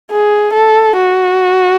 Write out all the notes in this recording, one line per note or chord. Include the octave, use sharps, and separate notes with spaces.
G#4
A4
F#4